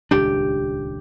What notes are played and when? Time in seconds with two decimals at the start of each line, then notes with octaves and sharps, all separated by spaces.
0.11 D#1 C#2 D4 G4